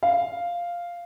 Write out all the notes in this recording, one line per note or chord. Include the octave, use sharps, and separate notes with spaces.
F5